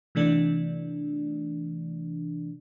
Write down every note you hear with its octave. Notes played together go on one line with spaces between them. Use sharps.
C3 E3 A3 D4